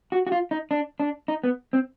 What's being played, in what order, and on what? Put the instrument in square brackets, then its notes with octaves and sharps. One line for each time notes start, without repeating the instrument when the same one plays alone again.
[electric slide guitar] F#4
F#4
F4
D#4
D4
D4
D#4
B3
C4